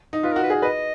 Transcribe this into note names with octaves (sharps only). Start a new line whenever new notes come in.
D#4
F4 B4
F#4 A#4
B4
G#4
B4 D#5